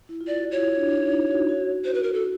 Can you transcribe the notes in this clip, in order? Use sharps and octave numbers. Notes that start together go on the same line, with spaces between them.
E4
F4
D5
F#4
C#5
E4
D4
D#4
E4
F#4
F#4
F#4 C5
B4
A#4
A4